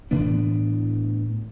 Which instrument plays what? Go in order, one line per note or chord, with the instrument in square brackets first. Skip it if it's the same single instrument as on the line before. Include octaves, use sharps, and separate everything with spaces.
[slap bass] A2 E3 B3 D4